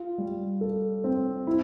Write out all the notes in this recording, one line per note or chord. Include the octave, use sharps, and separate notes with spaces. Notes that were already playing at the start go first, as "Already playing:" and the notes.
Already playing: F4
G3
A4
C4
E4